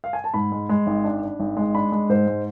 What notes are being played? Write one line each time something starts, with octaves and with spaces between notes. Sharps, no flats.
F5
G#5
A5
G#2 B5
G#3
G#3
G#1
D4
D4
G#1
G#3
D4 B5
G#3
G#2 C5
G#3